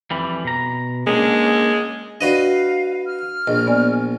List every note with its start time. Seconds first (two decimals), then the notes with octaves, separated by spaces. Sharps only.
0.11 F2 E3 G3
0.45 B2 A#5
1.07 G#3 A#3 C#4 D4
2.21 D4 F#4 B4 D5 D#5 F5
3.06 F6
3.47 A#1 D#5
3.67 B3 D5 G#5